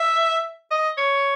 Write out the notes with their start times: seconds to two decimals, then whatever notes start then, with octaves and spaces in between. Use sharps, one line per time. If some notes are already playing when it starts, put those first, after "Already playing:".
Already playing: E5
0.71 D#5
0.98 C#5